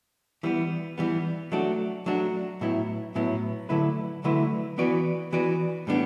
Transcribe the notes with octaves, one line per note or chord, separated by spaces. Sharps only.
E3 G3 B3
E3 G3 B3
F#3 A3 D4 F#4
F#3 A3 D4 F#4
A2 F#3 B3 E4
A2 F#3 B3 E4
D3 F#3 A3 E4 B4
D3 F#3 A3 E4 B4
E3 B3 F#4 B4 D5
E3 B3 F#4 B4 D5
A2 G3 B3 D4